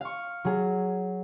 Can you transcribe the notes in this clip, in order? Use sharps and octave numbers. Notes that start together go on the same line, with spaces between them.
F5 C#6
F#3 G#4